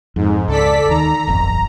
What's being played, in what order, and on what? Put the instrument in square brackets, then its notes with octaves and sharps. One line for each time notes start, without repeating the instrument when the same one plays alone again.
[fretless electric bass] F2 [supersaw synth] G#2
[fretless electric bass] C#2 [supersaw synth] A4 D5 B6
[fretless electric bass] D#2 D#3 [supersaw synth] A#5
[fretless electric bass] D1 G1 F2